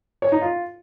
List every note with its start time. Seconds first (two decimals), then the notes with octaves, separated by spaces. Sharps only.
0.22 C#5
0.32 D#4
0.41 F4